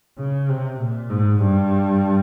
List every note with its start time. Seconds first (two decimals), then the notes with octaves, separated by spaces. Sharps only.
0.19 C#3
0.49 C3
0.80 A#2
1.10 G#2
1.41 G2